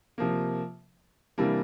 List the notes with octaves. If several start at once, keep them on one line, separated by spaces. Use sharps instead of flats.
C3 F3 A#3
C3 E3 G3 A#3 D4